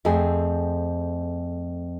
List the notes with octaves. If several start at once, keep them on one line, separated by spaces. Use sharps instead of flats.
F2 A3 C4 G#4 G#5